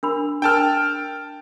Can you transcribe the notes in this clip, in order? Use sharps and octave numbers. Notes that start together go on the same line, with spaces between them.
D4 A#4 B5
D4 A#4 G5 A5 F6